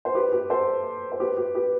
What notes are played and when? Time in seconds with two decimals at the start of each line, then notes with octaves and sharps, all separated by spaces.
0.05 C5
0.14 G4 B4
0.32 G4 B4
0.50 A4 C5
1.12 C5
1.20 G4 B4
1.37 G4
1.55 G4 B4